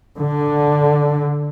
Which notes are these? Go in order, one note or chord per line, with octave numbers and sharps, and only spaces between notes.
D3